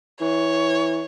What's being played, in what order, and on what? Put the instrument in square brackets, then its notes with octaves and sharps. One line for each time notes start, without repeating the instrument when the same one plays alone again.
[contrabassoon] E3 [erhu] C#5